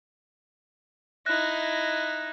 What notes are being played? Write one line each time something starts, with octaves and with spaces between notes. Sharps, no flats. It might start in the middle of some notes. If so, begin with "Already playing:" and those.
D#4 E4 F#6 A#6